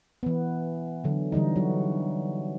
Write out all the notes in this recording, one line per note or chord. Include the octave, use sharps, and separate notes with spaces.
E3 B3
D3 F#3
D3 E3 G3 D#4
F#3 F#4